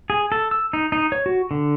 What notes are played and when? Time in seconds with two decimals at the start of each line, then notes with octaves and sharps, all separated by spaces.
0.10 G#4
0.32 A4
0.51 E6
0.73 D#4
0.92 D#4
1.12 C#5
1.26 F#4
1.51 D3